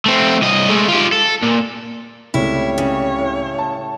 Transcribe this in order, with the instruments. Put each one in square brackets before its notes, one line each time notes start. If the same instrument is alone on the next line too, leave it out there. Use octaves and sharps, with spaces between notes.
[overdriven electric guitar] A3 C4
C2 D#5
G#3 A3
F4 G4
A4
A#2
[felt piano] C#2 C3 A3 [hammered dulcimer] A2 G3 [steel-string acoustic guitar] E4 [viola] C#5
[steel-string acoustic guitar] C#3
[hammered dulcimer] A2
[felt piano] A5